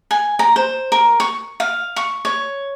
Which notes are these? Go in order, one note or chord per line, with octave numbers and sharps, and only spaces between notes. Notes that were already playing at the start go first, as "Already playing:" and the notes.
G#5
A#5
C5
A#4
C#6
F5
C#6
C#5